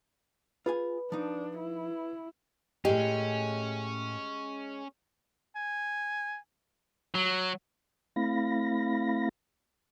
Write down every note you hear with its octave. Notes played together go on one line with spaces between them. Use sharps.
F4 G#4 B4 G#5
F3 D4 D#4
E4
A2 G#3 C#4 G4 G5
G#5
F#3
A3 C4 E4 F5 B5 A#6